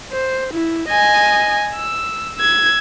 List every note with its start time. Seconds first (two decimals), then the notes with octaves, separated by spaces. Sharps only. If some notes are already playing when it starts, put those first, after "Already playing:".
0.12 C5
0.53 E4
0.88 D#5 G#5
1.75 E6
2.37 E6 G#6